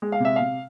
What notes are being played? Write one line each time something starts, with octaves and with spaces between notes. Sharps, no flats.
G#3
F5
C3 E5
C3 F5